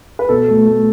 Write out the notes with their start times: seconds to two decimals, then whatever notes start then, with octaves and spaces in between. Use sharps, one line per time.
0.19 B4
0.29 B2 A4
0.48 A3
0.66 A3